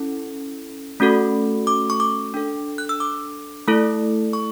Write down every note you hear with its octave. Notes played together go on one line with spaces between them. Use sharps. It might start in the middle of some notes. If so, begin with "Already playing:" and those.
Already playing: C#4 E4 A4
A3 C#4 F#4 A4
D6
C#6
D6
D4 A4
F#6
E6
D6
A3 E4 A4
C#6